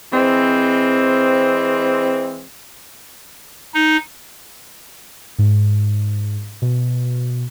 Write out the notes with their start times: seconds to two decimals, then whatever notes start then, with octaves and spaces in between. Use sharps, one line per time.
0.13 E3 G#3 C4
3.74 D#4
5.38 G#2
6.62 B2